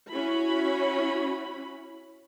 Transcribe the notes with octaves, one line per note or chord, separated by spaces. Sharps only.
C#4 E4 F#4 B5